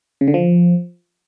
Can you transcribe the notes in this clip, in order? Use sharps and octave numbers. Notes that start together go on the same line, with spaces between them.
C#3
D3
F3